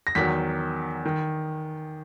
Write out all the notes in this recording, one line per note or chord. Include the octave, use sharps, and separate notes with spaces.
A#6
E2 D#3 F#3 B6
D#3